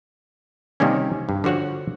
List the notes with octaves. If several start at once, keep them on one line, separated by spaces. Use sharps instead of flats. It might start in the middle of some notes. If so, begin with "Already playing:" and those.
C3 D#3 G3 A#3 C#4
G2
D3 F3 F#4 C#5 F#5